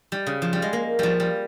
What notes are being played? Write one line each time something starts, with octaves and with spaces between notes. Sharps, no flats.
G3
C#3
F3
G3
G#3
A#3
F3 G3
G3